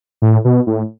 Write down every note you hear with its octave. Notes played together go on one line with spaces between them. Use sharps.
A2
B2
A2